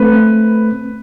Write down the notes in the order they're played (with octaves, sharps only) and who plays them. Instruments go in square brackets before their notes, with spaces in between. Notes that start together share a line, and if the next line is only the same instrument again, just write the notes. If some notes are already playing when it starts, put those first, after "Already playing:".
Already playing: [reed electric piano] A3 C4 [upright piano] B4